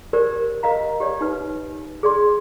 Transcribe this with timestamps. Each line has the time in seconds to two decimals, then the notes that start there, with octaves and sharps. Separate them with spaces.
0.13 G4 A#4 C5 D5
0.63 A#4 D#5 F5 A#5
1.00 G4 C#5 D5
1.21 D#4 B4
2.03 G#4 D5 C6